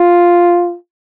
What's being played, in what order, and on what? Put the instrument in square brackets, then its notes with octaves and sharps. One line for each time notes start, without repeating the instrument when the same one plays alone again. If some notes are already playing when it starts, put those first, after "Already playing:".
Already playing: [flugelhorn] F4